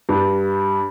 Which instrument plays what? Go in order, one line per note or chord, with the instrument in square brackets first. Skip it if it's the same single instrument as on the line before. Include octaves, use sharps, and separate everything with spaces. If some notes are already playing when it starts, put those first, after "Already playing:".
[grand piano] G2